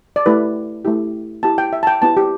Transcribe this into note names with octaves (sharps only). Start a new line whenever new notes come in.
D5
A3 E4 G4 B4
A3 E4 G4
B3 E4 G4 A5
G5
E5
A5
G5
B3 E4 G4 A5
G4